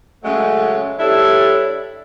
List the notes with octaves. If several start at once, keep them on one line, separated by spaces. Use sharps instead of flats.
C#3 F#3 G#3 A3
G3 D4 E4 A4 C#5 E5